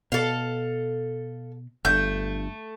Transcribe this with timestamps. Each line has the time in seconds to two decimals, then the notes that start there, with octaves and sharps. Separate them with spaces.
0.12 B2 A4 F5
1.85 G1 G2 A3 G6